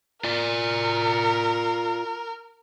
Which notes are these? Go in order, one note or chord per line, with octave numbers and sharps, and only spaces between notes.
F4 A#4 D5